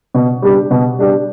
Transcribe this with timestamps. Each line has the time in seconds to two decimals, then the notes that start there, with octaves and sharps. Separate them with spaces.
0.14 B2
0.42 G3 D4 G4
0.71 B2
0.99 G3 D4 G4